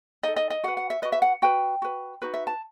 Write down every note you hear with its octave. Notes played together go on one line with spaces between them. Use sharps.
D#4 A4 D#5
D#5
D#5
F#4 B4 F#5
F#5
E5
F#4 B4 D#5
E5
F#5
F#4 B4 G5
F#4 B4
D#4 F#4 B4
E5
A5